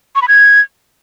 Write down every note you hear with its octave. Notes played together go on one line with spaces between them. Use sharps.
C#6
B5
G#6